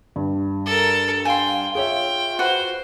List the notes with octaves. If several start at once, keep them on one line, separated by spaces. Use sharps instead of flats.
G2
A4 A#4
F5 G5 G#5 C6
F4 G#4 C#5 E5 G5
F#4 B4 C5